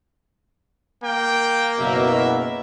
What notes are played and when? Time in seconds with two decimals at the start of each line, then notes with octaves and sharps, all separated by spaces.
1.04 A#3 G5
1.79 F#1 B2 E5